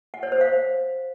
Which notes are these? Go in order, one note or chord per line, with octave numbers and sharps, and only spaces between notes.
F#5
C#5
C5
F5